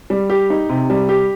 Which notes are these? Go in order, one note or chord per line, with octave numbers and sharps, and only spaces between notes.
G3
G4
D#4
C3
G3
G4